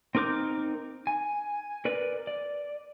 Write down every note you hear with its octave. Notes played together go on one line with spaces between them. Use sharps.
C4 D#4 A#4 D6 G6
G#5
A#4 B4 D5
D5